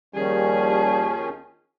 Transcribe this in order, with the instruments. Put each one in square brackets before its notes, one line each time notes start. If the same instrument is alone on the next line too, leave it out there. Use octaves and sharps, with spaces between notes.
[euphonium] D#2 [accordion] D#3 F3 C#4 [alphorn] G3 [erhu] G#4